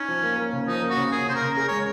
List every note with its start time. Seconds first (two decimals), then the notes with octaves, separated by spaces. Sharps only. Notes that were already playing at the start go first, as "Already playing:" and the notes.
Already playing: C#4 D#4
0.08 F3
0.23 A#3
0.38 A#3
0.53 C#3
0.68 F3 D#4
0.82 A#3
0.90 F#4
0.97 C#3
1.12 A#3 G#4
1.27 C#3 C5
1.35 A#4
1.42 C#3
1.56 G#4 A#4
1.68 G#3 C#5